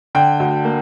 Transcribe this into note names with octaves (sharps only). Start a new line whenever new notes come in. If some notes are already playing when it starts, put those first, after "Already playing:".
D3 G5
D2
A#3